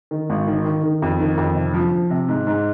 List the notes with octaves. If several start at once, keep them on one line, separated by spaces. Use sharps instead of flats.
D#3
G#1
D#3
D#3
D#3
F2
D#3
F2
C3
F3
F3
C3
G#2
G#2